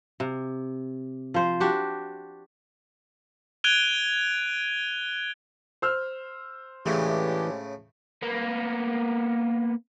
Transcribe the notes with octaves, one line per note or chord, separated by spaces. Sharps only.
C3
F3 C5
D4 F#4 G4
F#6 G#6 D7 D#7 F7 G7
C5 E6 F6
A2 C#3 E3 G#3 A3 D4 G4
A#3 B3